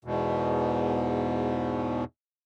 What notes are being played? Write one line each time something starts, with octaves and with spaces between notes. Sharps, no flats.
E2 G#2 B2